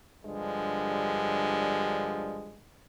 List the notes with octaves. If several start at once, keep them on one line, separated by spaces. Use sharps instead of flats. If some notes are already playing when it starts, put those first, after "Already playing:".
G2 D3 F3 G3 G#3